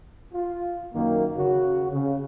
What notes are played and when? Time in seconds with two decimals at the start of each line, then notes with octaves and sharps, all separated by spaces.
0.33 F4
0.94 F#2 D#3 A#3
1.37 C#3 F#4
1.93 C#3